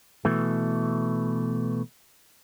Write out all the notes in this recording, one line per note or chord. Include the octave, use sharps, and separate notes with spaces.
B2 E3 A3